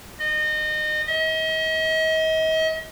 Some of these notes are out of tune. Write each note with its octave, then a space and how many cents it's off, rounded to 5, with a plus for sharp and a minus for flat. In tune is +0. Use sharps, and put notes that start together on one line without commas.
D#5 -30
D#5 +40